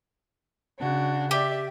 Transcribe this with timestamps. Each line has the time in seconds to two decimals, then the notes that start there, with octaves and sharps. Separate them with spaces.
0.79 C#3 D4 F#4
1.31 G4 D5 E5